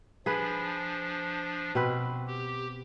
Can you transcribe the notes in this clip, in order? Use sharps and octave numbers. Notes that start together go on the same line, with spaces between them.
F3 D4 G#4 B4
B2 C4 B4
G4